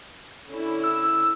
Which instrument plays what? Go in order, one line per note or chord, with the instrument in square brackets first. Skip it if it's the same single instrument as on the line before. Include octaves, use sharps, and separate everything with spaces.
[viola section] D3 C#4 E4
[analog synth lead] E6